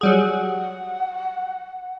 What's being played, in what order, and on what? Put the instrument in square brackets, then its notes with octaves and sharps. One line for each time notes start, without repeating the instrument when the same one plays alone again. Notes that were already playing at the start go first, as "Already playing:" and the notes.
[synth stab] F#3 G3 G#4 [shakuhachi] F#5